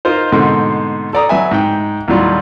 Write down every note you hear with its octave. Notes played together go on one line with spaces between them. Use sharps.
D#4 F4 A#4 C5
G#2 B2 D3 A3 C4
A4 D5 A#5 D#6
F#3 B4 E5 G#5
G#2 G5
D#2 A2 F#3 G3 F4